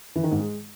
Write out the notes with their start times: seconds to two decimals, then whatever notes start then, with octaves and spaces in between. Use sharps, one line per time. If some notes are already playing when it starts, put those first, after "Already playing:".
0.15 E3
0.23 D#3
0.31 G#2
0.39 G#3